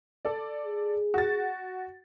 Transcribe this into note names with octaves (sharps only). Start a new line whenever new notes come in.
A4 D5
G#4
F#4 A6